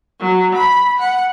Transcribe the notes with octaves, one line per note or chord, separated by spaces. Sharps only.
F#3
B5
F#5